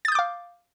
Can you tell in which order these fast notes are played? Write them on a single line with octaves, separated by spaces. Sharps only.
A6 D#6 G6 D6 F5